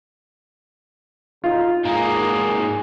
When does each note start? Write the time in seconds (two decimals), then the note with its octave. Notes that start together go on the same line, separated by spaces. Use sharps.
1.44 D2 C#3 D#4 F4
1.85 G#2 D#3 F#3 A#3 G#4